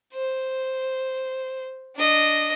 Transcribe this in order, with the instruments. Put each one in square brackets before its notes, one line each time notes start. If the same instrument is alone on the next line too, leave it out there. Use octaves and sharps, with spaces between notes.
[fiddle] C5
D4 D#5